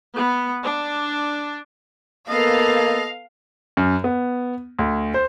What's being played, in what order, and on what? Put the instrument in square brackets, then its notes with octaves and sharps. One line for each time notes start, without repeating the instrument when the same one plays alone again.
[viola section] B3
D4
[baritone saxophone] A#3 [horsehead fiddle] B3 A4 [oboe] D#5 [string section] F5
[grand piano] F#2
B3
D2
C5